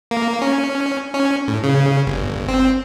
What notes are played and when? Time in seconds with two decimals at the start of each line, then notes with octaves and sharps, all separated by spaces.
0.11 A#3
0.42 C#4
1.14 C#4
1.48 A2
1.64 C#3
2.07 G1
2.48 C4